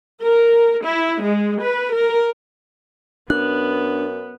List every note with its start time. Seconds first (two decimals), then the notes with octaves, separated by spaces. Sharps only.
0.24 A#4
0.84 E4
1.21 G#3
1.60 B4
1.94 A#4
3.30 F#2 B3 D4 F#6